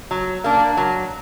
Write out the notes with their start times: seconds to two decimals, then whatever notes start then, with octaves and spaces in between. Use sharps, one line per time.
0.11 F#3
0.44 A#3 D4
0.77 F#3